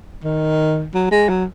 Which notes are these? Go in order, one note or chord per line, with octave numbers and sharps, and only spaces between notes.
D#3
F#3
G#3
F#3